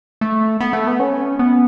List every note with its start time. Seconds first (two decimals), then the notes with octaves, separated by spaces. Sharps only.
0.21 A3
0.61 B3
0.73 A3
0.87 B3
1.00 C#4
1.39 B3